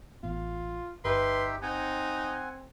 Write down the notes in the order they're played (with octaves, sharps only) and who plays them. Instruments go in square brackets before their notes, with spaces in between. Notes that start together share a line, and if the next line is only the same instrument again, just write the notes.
[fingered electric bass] A1 B3 [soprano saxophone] F4
[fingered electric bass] G1 [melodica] D#4 G4 E5 [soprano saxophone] B4 [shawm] C6
[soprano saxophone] C4 [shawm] D#4 [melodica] F#5 G#5